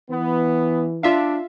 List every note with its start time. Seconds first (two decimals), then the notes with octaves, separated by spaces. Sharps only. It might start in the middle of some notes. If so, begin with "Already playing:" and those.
0.10 E3 B3
1.03 D4 F4 E5 F5